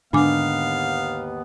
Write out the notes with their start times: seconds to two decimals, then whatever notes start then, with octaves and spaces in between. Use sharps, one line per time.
0.13 D#2 G#2 D3 B3 D4 F5 G#5 D6